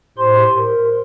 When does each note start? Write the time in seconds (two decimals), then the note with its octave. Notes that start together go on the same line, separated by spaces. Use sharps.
0.18 A2 G4 C5 C6
0.57 A#4